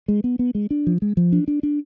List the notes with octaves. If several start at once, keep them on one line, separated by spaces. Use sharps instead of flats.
G#3
B3
B3
G#3
D4
F3
G#3
F3
D4
D4
D4